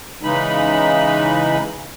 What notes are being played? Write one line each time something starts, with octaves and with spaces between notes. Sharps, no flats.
C#3 E3 G#3 D#4 B5